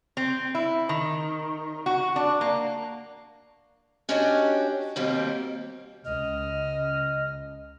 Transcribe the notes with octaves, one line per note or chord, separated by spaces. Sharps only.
C4
E4
D#3
F#4
D4
A#3
C#4 D4 F#4 G4 C#5 D#5
D#2 B2 G3 A#3 C4
C#2 D#5 F6